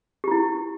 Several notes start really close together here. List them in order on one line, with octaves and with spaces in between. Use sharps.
G4 F4 E4